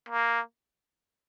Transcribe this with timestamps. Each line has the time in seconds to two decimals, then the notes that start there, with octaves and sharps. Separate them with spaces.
0.09 A#3